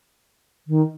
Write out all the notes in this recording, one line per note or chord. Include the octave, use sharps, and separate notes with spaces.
D#3